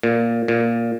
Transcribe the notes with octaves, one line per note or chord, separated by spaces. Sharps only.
A#2
A#2